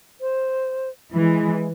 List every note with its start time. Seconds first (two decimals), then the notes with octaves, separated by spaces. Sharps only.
0.21 C5
1.14 E3 G#3